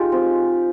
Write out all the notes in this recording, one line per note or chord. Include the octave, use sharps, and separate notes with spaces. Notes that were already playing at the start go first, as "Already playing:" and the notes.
Already playing: G#3 D#4 F4 G4
C4